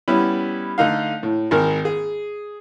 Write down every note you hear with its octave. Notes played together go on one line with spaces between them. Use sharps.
G3 B3 C#4 E4
D3 A3 D#4 F5
A2
G#1 D#3 A#4
G#4